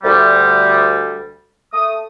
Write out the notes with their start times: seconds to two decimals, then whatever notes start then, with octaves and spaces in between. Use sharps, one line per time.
0.04 D2 G3
1.73 A3 D#6